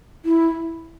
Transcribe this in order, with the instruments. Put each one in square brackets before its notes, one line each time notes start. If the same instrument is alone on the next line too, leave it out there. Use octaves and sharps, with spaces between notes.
[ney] E4